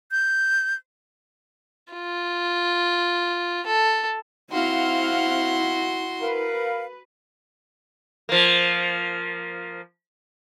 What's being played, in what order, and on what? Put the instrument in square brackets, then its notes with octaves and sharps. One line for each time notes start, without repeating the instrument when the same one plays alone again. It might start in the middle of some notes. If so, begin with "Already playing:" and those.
[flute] G6
[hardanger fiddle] F4
A4
[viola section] C4 F5 F#5 [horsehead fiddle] E4 [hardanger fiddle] F#4 C6
[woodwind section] A#4 F5 [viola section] B4
[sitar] F3 A#3